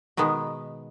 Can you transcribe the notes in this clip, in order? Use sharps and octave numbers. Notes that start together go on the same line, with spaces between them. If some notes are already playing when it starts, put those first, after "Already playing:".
B2 D#3 G#3 B3